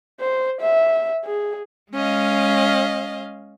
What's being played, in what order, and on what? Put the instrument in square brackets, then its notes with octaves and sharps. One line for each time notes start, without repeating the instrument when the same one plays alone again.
[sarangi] C5
E5
G#4
[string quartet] G#3 C#4 D#5 F5